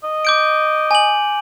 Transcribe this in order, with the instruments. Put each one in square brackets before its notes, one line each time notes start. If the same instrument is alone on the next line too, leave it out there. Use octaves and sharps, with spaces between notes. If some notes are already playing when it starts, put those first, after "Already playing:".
[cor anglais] D#5
[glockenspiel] D6 G6 D7
G#5 F#7